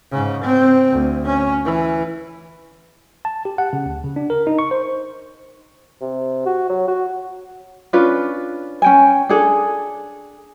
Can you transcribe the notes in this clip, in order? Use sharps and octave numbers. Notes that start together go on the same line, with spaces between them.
G#2 C#3
C4
D2
C#4
E3
A5
G4
F#5
C#3
D2
C#3
D4
A#4
D#4
C#6
C5
C3
F#4
F#3
F#4
C#4 D4 F4 B4
C#4 G5 G#5
D4 G#4 A4